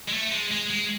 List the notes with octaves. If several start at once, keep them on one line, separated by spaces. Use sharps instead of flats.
G#3
A3
G#3
G#3
G#3